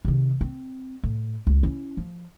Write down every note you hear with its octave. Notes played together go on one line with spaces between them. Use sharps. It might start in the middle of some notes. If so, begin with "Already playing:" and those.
C3 D#3
C4
A2
C#2
C#4 E4
F3